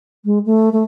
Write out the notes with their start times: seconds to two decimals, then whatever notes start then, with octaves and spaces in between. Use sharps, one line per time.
0.25 G#3
0.46 A3
0.72 A3